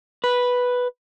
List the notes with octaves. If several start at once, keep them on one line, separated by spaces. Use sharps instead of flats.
B4